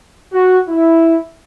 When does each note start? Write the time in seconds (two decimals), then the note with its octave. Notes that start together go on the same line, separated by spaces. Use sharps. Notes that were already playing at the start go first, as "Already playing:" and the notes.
0.33 F#4
0.68 E4